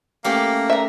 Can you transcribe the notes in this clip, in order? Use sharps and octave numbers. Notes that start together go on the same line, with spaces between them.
A3 A#3 C#4 G4
A#4 E5